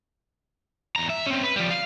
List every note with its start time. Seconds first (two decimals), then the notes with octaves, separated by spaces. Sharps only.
0.96 E2 A#5
1.10 E5
1.27 C4 C#4
1.43 B4
1.56 F3 G3
1.70 F5